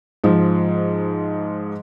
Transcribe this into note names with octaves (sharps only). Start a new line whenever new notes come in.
G#2 F3